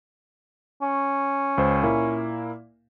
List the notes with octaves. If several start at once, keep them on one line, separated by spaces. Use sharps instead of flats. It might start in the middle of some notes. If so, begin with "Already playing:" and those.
C#4
C#2 C5
A#2 A#3 E4